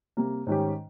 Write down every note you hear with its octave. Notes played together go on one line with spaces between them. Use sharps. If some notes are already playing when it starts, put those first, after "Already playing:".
C3 G3 A#3
G#2 D#3 G3 C#4 G4